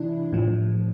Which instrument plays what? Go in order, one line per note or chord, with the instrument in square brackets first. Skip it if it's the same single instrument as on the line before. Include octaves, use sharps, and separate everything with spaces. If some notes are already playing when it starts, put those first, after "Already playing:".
Already playing: [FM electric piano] C3 E3 D4 E4
A2 F3